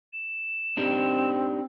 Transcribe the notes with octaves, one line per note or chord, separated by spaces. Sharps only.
E7
C4 D4 D#4 G4